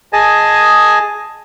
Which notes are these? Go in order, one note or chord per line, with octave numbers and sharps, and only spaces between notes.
G#4 D#5 G#5 A5